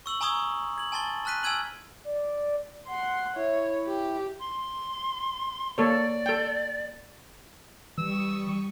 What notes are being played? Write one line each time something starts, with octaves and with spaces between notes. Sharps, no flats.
C#6 E6 F#7
G#5 A#5 C#6 D#6 E6 G#6
G#6 F#7
G#5 A5 C6 A6 G7
A5 F6 F#6 B6 D#7
G#5 E6 F6 G#6 D#7 F#7
D5
F#5 C6
E4 C#5
G4
C6
A#3 A4 C#5 D5
A4 G5
E3 G3 C#6 D#6 E6